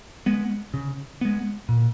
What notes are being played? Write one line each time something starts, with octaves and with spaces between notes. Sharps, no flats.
G#3 B3
C#3
G#3 B3
A#2